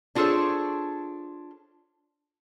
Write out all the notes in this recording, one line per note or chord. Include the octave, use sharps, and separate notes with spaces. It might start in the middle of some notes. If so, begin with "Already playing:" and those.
D4 F4 G#4 A4 C5 C#5